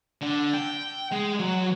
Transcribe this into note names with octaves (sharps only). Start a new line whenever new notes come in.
D3
G5
G#3
F#3